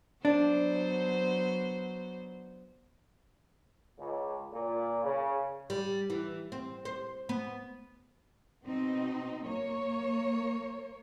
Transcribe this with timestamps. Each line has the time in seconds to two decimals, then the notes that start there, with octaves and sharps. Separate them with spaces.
0.25 F#3 B3 D4 C5
3.97 C#2
4.52 A#2
5.02 C#3
5.70 G3
6.10 E3
6.52 C4
6.85 C5
7.29 B3
8.64 B2 C4 D#4
9.45 A#3 C#5